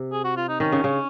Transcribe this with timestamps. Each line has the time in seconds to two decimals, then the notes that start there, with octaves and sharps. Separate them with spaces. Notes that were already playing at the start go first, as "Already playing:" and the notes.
Already playing: C3
0.12 G#4
0.25 F#4
0.37 F4
0.49 D#4
0.60 D#3 C#4
0.72 C#3
0.84 C#3